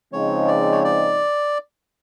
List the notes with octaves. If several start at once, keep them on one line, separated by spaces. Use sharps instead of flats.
C#3 F3 G#3 C4 D#4 C#5
D5
C#5
D5